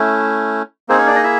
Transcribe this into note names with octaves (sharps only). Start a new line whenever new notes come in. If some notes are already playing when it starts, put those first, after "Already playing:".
Already playing: A3 C#4 E4
A#3 C4 D#4 G#4 C5
C#4 C#5
D4 D5
D#4 D#5
E4 E5